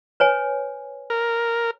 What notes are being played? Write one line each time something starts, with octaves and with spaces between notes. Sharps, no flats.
B4 C#5 G#5
A#4